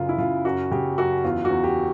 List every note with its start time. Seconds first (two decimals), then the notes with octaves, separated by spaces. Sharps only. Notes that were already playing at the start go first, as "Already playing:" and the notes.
Already playing: F#2 C#3 F4
0.09 E4
0.18 C#3 F4
0.45 F#2 F#4
0.71 C#3 G4
0.98 F#2 F#4
1.24 E2 F4
1.45 F#4
1.50 E2
1.64 G4